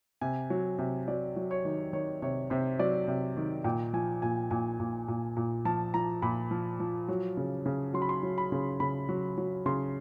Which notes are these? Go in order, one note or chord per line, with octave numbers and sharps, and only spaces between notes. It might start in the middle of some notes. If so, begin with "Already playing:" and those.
C3 G#5
F#3
C3
F#3 D5
F#3
C#5
D#3
D#3 C#5
C3 C#5
C3 C5
F#3 D5
C3
D#3
A#2 G5
F3 G#5
A#2 G#5
A#2 G#5
A#2
A#2
A#2
F3 A5
F3 A#5
A#2 B5
F3
F3
F#3
C#3
C#3
F#3 C6
B5
C6
F#3
B5
C#3
C#3 B5
F#3
F#3
C#3 C6